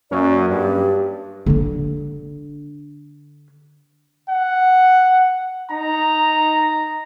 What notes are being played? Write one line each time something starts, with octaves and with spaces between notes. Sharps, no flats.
F#2 F#3 A#3 C#4 D5
G2 G4
D3 D4
F#5
D#4 A#5